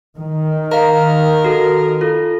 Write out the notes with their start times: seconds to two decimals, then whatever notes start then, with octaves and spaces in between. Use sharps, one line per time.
0.17 D#3
0.72 A#4 F5 A#5
1.44 F#4 A4
2.01 F4 A4